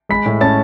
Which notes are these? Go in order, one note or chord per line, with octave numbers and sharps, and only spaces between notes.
G#3 B5 B6
A2
C#4 A5 A6